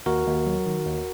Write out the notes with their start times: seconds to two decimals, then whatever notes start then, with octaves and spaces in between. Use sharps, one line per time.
0.06 D#2 F#4 A#4
0.26 D#2
0.46 F#3
0.66 D#3
0.86 D#2